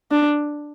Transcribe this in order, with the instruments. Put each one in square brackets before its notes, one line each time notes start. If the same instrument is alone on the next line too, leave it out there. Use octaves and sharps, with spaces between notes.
[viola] D4